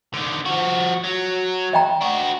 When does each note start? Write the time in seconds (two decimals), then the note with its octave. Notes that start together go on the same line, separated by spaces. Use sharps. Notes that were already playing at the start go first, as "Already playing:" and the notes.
0.14 D3 D#3
0.45 F3 F#4
1.04 F#3
1.73 D#5 G5 A#5
2.01 D4 F#4